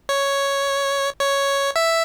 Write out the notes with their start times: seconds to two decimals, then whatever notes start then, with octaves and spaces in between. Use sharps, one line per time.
0.09 C#5
1.20 C#5
1.76 E5